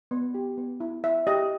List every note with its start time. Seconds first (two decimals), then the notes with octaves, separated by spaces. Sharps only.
0.11 B3
0.34 G4
0.57 B3
0.80 E4
1.04 E4 E5
1.27 G4 D#5